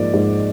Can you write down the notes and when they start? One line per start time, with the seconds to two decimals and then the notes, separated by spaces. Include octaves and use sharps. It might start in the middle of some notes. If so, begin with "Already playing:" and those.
Already playing: G#2 F3 A#3 D5
0.14 G#2